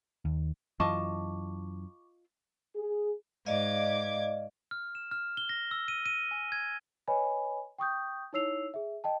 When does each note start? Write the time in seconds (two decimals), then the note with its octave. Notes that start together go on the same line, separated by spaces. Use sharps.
0.25 D#2
0.80 F#2 E3 F4 D#5 A5 C#6 D6
2.76 G#4
3.46 G#2 D5 D#5 F5 D6 G#6
4.71 F6
4.95 E7
5.11 F6
5.37 G7
5.49 A#6
5.71 E6
5.88 D#7
6.06 D#7
6.31 G#5
6.52 G#6
7.08 B4 C#5 D#5 G#5 B5
7.78 G5 C#6 D#6 G6
8.33 D#4 E4 C#5 E6 C7 F7
8.74 G#4 E5
9.04 D#5 G5 A5